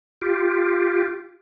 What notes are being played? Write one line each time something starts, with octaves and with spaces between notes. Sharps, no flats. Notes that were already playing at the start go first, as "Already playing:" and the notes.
F4 G4